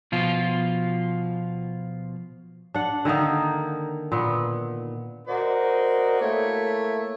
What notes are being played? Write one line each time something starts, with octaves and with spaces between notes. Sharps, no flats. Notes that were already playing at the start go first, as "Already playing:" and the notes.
B2 F3 F4
D4 F#5
D3 D#3 A#3 D#4
A#2 B3
F#4 A#4 C5 D5 D#5
A3 A#3 E4 C#5 E5